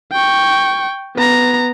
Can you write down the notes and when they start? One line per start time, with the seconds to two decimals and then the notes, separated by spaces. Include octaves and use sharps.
0.12 G5 C#6
1.16 B3 A#5